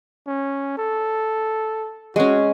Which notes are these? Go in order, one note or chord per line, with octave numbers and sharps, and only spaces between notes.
C#4
A4
G#3 C#4 F#4